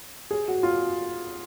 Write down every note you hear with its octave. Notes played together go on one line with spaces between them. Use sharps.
G#4
F#4
F4